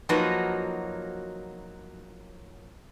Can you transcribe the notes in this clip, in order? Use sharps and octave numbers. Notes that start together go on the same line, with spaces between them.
F3 F#3 A#3 D#4 F#4 B4